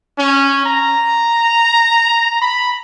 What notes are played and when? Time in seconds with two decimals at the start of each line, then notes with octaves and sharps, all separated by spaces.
0.18 C#4
0.65 A#5
2.41 B5